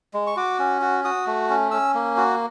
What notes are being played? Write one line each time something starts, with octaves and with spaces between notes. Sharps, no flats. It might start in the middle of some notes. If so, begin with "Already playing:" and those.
G#3
C#6
F#4 D6
C#4
F#4
F#4 D#6
A3
C#4
C#4 E6
A#3
F#4